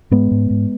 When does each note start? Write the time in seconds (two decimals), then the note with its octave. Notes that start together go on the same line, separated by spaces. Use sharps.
0.11 G#2 G#3 B3
0.31 G#2
0.50 G#2